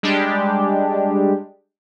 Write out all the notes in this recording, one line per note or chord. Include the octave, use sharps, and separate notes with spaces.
G3 G#3 D4 G4